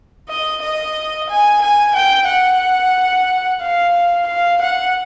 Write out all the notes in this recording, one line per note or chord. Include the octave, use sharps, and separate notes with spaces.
D#5
D#5
G#5
G#5
G5
F#5
F5
F5
F#5